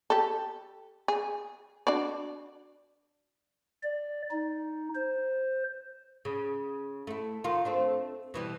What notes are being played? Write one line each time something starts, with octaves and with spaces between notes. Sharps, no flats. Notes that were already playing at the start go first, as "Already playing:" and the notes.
G4 A4
G#4
D4 F#4 D5
D5
D#4
C5
C#3
A3 E4
D#3 F4
A3 C4 D4
B2 E3 G3